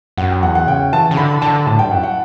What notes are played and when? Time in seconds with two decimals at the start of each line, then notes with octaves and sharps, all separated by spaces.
0.18 F#2 F#5
0.31 G5
0.43 E2 F#5
0.55 F#5
0.67 C#3 G5
0.93 E3 A5
1.11 C#3
1.17 D3 B5
1.42 D3 A5
1.67 A2 A5
1.79 G2 G5
1.91 F#2 F#5
2.03 F#5